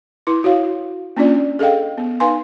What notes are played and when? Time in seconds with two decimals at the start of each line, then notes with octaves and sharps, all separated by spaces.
0.27 E4 B4 C6
0.44 F#4 C#5 F5
1.17 A#3 C#4 D4 F4 D5
1.59 G#4 A4 D#5 F5 G5
1.98 B3
2.20 D#4 B4 F5 G#5 C6